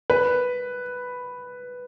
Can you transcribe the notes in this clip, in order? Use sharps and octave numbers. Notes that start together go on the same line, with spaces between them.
B4